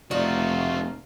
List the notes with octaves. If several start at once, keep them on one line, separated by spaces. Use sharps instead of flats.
F1 A3 D#4 F4 F#4